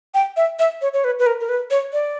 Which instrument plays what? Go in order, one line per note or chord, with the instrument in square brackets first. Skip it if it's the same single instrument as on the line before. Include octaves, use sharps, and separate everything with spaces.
[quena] G5
E5
E5
C#5
C#5
B4
B4
A#4
A#4
B4
C#5
D5